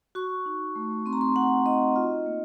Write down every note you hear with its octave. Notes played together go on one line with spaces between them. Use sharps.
F#4 C#6
D#4
A3
C4 C6
A#5
C6
F#4 F#5
D#4 D#5
F4
A#3